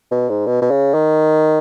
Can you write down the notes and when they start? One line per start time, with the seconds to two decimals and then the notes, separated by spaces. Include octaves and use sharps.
0.12 B2
0.29 G#2
0.47 B2
0.62 B2
0.71 C#3
0.94 D#3